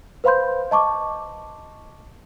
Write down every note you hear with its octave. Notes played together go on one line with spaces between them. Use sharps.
B4 C5 F5 B5 C6 G6
D#5 A5 C#6 D6